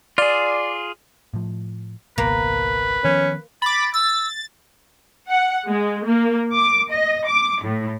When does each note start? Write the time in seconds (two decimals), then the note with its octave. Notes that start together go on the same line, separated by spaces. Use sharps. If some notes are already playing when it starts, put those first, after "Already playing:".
0.18 F4 G#4 D5
1.34 A2 F3
2.18 G#1 C#2 B2 A#3 B4
3.04 D#3 F3 B3 C#4
3.62 B5 D6 A6
3.94 E6 A6
5.30 F#5
5.66 G#3
6.05 A#3
6.54 D6
6.92 D#5
7.27 D6
7.63 A2